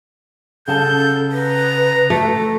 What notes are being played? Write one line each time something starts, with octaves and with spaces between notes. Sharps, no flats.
C#3 A4 F#5 A5 G6
B4 A#5
A3 A4